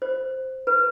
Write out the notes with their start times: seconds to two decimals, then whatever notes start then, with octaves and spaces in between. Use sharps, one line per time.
0.02 C5
0.67 B4